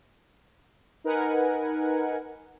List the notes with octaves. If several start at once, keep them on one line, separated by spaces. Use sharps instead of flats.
D#4 A#4 B4 F#5 G#5